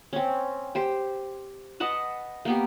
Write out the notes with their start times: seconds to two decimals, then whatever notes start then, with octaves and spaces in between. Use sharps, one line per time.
0.13 C4 C#4
0.75 G4 C5
1.80 B4 D#5 F#5 A5
2.45 A#3 B3 G4